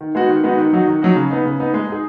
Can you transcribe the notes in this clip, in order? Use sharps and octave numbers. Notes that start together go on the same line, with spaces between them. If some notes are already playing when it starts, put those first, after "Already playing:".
D#3
G#3 B3 D#4 F#4
D#3
G#3 B3 D#4 F#4
D#3
F#3 D#4 F#4
D#3
F#3 D#4 F#4
C#3
B3 D#4
C#3
B3 D#4
G#3
D#4 G#4